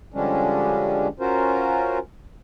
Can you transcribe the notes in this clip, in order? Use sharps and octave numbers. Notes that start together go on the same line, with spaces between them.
D3 F3 G3 G#3 C#4 D4
C#4 F4 F#4 A#4 C5